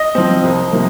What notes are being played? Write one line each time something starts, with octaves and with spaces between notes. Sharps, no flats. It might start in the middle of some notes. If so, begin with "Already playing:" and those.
Already playing: D#5
F3 C4
C2
C3 F3 A#3